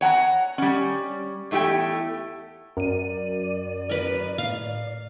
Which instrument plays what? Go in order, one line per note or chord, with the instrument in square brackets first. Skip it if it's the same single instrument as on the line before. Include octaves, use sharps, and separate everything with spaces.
[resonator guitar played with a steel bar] C#5 F#5 A5 A#5
G3 C#4
E2 A3 E4 G4 G5
[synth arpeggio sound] F#2 D#7 [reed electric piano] A#4 [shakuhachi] D5
[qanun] A#4 B4
[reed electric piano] A2 [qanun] F5